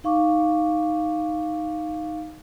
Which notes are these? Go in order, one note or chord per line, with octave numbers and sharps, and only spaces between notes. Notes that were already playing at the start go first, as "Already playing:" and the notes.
D#4 F5 C#6 D6